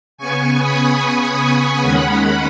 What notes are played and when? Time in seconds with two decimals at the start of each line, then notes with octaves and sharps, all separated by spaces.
0.18 C#3 B3 G#5 C#6
0.59 B5 D#6
1.00 G#5 C#6
1.82 D#2 D#3 G#3 C#4 F#5 B5